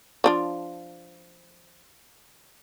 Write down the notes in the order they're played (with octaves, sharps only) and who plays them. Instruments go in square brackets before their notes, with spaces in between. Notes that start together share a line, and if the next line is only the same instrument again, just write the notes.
[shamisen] F3 D4 F4